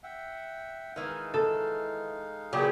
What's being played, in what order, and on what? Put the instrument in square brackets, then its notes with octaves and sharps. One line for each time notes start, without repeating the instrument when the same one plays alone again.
[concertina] E5 F#5 G5
[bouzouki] D#3 E3 [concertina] G#3 D#4 F5
[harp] A4
[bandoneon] A#2 F#3 G4 [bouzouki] C#3 B3